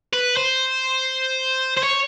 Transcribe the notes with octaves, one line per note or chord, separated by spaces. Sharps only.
B4
C5
C5
C#5